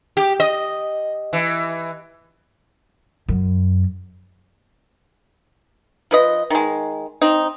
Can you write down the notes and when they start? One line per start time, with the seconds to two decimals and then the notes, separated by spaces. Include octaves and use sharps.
0.17 G4
0.40 D#5
1.33 E3
3.29 F#2
6.11 F3 B4 D#5
6.50 D#3 G#3
7.22 C4 D#4